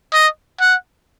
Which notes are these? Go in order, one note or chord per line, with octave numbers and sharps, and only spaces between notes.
D#5
F#5